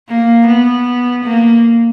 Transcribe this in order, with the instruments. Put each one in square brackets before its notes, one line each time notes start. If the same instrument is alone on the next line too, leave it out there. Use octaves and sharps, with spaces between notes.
[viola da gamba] A#3
B3
A#3